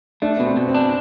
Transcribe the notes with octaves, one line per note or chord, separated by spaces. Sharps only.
A3 D4
B2 B3
C4
B2
C4
D4